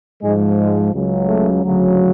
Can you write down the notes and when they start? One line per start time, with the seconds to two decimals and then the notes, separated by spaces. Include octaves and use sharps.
0.22 G#2 F3 G#3
0.58 G#3
0.92 C#2 C#3 F#3
1.28 A3
1.63 D2 C#3 F#3